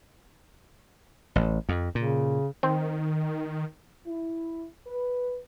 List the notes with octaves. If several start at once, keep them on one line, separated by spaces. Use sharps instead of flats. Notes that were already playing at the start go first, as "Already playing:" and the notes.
A1
F2
A#2 C#3
D#3 C4
E4
B4